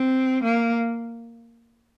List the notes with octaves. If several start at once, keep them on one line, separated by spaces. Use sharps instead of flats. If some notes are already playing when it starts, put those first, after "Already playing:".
Already playing: C4
A#3